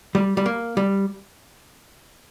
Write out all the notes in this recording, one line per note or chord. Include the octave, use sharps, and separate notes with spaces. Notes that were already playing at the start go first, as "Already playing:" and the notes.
G3
G3
A#3
G3